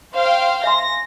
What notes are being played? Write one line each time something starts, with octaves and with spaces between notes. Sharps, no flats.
C5 F5 G5
E5 G#5 C6 A#6